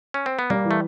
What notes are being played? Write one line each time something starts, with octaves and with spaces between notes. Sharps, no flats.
C#4
C4
B3
G3 A#3
E3
A3